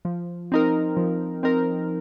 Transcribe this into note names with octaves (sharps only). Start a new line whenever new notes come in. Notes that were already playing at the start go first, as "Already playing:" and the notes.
F3
C4 D#4 A#4
F3
C4 D#4 A#4